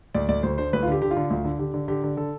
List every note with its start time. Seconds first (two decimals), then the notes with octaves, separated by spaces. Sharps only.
0.14 D2 D5
0.28 D2 D5
0.43 D2 C5
0.58 D3 C5
0.73 D2 B4
0.83 F4
0.88 D3 G4
1.02 D3 G4
1.11 F4
1.17 D3
1.30 D2 F4
1.45 D3
1.59 D3 G4
1.74 D3
1.88 D3 G4
2.04 D3
2.17 D3 A4